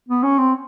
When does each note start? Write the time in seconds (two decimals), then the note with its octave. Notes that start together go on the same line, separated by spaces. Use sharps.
0.09 B3
0.23 C#4
0.39 C4